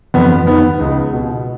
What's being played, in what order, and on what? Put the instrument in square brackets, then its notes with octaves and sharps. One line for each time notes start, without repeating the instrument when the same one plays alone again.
[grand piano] F2 B3
D#3 B3
C#2
B2